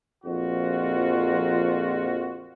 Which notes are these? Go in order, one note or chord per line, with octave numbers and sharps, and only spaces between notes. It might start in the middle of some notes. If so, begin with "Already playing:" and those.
A#1 F2 F4 F#4